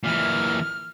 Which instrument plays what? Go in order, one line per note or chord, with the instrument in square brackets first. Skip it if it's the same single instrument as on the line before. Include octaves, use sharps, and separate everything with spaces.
[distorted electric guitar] A#2 E3 [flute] F6